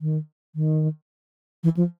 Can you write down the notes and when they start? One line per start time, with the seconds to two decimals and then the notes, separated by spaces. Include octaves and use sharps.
0.01 D#3
0.55 D#3
1.64 E3
1.77 F3